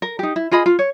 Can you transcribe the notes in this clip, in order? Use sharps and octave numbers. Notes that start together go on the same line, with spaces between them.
A#4
D#4 G4
E4
F4 G#4 D#5 B5
F4
C#5